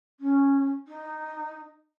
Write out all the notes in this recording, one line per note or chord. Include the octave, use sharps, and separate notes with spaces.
C#4
D#4